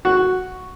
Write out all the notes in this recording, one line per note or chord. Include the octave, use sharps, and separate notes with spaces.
F#4